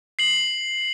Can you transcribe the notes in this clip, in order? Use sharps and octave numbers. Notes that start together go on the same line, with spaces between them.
C7 F#7